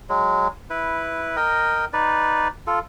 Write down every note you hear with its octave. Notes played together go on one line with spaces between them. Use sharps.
F#3 G#3
E4 B4
A#4 D#5 G5
D#4 B4 D5
F4 A4